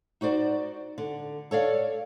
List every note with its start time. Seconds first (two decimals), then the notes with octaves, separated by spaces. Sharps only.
0.21 D#4 F#4 C5 D5
0.98 D3
1.51 A4 C#5 D5 F5